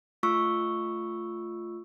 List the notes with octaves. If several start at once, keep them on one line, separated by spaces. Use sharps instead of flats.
A3 F4 C#6 E6